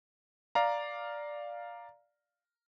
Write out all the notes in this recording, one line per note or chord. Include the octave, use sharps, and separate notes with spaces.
D5 F5 A#5